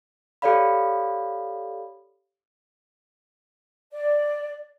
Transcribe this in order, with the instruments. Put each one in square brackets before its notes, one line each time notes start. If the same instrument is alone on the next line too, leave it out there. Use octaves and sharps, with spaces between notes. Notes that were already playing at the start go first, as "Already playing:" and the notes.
[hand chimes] G4 A4 C#5 D5 F5 B5
[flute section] D5